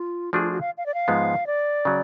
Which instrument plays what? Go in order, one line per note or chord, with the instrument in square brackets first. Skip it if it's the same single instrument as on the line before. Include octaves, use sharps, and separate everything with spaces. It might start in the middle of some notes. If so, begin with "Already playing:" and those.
Already playing: [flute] F4
[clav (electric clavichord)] F3 A3 D4 G#4 [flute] F#4
[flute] F4
F#4
F5
F5
D5
F5
[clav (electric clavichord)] G#2 F3 G#3 B3
[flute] D5
[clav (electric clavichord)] C#3 F#3